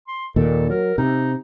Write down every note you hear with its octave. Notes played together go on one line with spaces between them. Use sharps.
C6
D#2 A#2 D#3 A4
F#3 A#4
C3 D#4